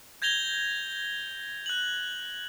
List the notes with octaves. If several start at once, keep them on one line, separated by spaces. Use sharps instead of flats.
G6 G#6 A#6 F7 G7
F#6 F#7